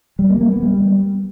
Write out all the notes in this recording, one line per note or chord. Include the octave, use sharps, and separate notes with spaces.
G3
A#3
A#3
B3
G3